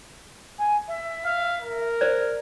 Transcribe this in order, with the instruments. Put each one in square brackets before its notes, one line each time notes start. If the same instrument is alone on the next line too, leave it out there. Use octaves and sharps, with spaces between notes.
[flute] G#5
E5
[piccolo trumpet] F5
A#4
[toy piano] C5 D5